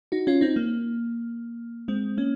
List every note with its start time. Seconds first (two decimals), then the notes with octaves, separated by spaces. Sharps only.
0.12 D#4 F#4
0.27 C#4 F4
0.41 C4 D#4
0.56 A#3
1.88 G#3 C4
2.18 A#3 C#4